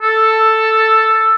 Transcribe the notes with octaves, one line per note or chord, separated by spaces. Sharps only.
A4